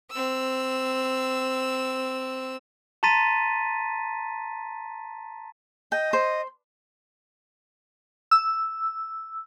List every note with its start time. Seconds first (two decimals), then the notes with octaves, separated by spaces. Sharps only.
0.11 C4 E6
3.03 A5 A#5 C6 A6 B6 D#7
5.92 D#5 G5
6.13 C5
8.31 E6